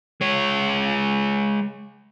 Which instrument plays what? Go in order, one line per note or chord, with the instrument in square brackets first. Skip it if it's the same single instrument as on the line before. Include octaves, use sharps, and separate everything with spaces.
[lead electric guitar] G#3 C#5